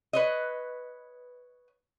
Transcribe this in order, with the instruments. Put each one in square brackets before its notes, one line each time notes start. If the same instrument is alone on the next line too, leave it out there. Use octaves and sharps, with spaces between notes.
[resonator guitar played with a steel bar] B4 C#5 D#5